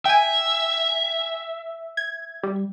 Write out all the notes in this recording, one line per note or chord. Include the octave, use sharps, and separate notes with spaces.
E5 G5 G#5
G#6
G3